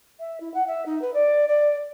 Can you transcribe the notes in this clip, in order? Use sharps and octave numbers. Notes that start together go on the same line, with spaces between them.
E5
E4
F#5
E5
D#4
B4
D5
D5